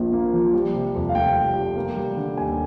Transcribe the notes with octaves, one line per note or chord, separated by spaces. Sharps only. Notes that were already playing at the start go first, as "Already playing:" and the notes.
Already playing: A#1 A#2 F3
A#3
F3
G3
C3
F2
F5
F1 G5
G3
C3
A#3
G3
D3
D#2 G#5